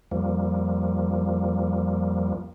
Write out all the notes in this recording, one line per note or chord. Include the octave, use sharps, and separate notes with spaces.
F2 F3 G3 A#3